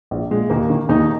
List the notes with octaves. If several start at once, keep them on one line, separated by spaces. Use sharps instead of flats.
A#1
A#2 G#3
D#2 A#3
D#3
D#2 D#4